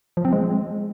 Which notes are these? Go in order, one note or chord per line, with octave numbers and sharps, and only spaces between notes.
F3
C4
G#3